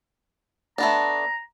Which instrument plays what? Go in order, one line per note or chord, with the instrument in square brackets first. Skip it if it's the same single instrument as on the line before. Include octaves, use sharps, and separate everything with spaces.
[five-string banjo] A3 B3 D4 [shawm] A#5